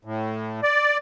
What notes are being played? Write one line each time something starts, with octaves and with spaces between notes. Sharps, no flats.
A2
D5